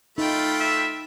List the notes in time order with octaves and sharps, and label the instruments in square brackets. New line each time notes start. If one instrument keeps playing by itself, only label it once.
[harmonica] A3 F4 [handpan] D#4 [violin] G5 B5
[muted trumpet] E5